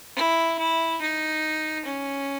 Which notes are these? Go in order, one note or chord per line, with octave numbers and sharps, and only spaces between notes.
E4
E4
D#4
C#4